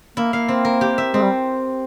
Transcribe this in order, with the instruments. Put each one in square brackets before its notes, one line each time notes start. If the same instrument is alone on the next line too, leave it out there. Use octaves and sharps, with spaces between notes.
[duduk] A#3 [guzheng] E4
[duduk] A#3 [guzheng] F5
[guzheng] C4
A#4
G4
E5
[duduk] G#3 [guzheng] C4
[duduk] G3